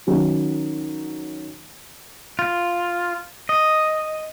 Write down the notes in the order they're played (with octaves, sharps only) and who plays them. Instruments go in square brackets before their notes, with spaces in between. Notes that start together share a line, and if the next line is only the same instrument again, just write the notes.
[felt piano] D#3 F#3 C#4
[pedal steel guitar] F4
D#5